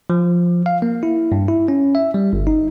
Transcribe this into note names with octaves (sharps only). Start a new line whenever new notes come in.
F3
F5
A#3
E4
G2
E4
C#4
E5
G3
G1
D#4